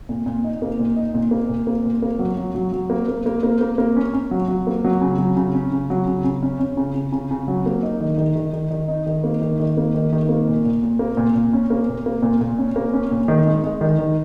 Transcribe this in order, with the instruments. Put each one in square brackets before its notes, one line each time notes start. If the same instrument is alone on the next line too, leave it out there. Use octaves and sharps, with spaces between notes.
[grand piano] A#2
A#2
D#4
A#3
A#2
D#4
A#2
A#3
A#2
A#3
A#2
A#3
F#3
F#3
F#3
F#3
A#3
A#3
A#3
A#3
A#3
A#3
C#4
C#4
F#3
F#3
A#3
F#3
C#3
F#3
C#3
C#4
C#3
F#3
C#3
C#3
C#4
C#4
C#3
C#3
C#3
C#3
F#3
A#3
D#4
D#3
D#3
D#3
D#3
D#3
D#4
D#3
A#3
D#3
D#3
A#3
D#3
D#3
A#3
A#2
A#2
A#2
A#3
A#2
A#2
C#4
A#3
A#2
A#3
A#2
A#2
C#4
A#3
C#4
A#2
D#3
G#3
G#3
D#3
D#3